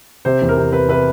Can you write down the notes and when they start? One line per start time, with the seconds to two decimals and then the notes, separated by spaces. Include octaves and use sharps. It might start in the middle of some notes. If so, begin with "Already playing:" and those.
0.25 C3 C5
0.42 E2
0.49 A#4
0.57 C3
0.73 C3 B4
0.89 C3 B4